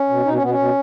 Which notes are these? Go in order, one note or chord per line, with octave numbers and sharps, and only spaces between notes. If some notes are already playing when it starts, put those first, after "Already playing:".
Already playing: C#4
B2
B2 D#4
C#4
B2 B3
C#4
B2